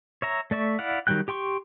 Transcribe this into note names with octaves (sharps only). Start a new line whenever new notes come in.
C#5 E5 A#5
A3 D5 E5 C#6
E4 D5 F5 F#5
D#3 F#3 G3 G5 F#6
G4 G5 C6 C#6